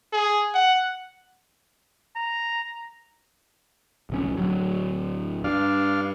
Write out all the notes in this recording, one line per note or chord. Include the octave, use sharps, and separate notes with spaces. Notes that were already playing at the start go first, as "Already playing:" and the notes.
G#4
F#5
A#5
D1 C2 C#4
D1 F#3
G2 D4 F5